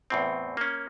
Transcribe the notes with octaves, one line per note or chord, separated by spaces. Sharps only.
E2 A2 C4
A#3 C#4